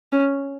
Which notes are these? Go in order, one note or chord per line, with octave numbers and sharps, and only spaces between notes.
C#4